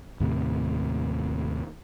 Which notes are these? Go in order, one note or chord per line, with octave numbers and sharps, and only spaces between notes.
D#2 A2 C3